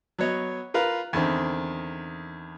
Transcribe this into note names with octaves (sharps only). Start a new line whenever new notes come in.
F#3 B3 C#5 D#5
F4 A#4 B4 F5
E2 D3 D#3 C4